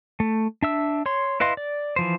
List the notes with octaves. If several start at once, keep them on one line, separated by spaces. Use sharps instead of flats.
A3
D4 E5 E6
C#5 C6
E4 B4 D#5 F5 C6
D5
E3 F3 C5